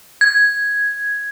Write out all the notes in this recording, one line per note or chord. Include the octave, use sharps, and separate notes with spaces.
G#6